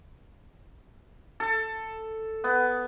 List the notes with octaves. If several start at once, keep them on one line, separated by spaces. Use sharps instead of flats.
A4
B3